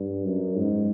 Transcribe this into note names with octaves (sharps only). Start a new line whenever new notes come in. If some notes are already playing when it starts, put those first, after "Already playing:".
Already playing: G2
F#2
G#2